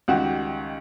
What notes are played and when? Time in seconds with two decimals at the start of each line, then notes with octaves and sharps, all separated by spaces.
0.08 C#2 D#3 G3 F#4 G4 F#5